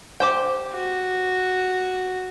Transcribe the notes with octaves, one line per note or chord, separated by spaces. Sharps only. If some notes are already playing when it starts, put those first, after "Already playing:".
G4 C5 G5
F#4